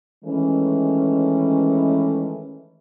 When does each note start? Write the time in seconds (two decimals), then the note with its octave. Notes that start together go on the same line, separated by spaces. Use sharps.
0.24 D#3 E3 G#3 A3 C#4